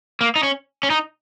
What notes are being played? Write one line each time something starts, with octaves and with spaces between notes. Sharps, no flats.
A#3
D#4
C#4
C#4
D#4